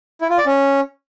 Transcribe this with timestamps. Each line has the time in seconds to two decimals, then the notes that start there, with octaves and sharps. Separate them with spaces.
0.21 E4
0.29 F4
0.38 D5
0.46 C#4